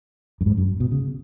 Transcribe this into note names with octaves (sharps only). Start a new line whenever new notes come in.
F#2
G#2
F#2
B2
C#3